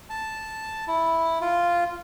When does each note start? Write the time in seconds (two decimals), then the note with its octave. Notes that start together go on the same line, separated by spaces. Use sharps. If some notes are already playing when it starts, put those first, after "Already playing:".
0.10 A5
0.87 E4
1.41 F4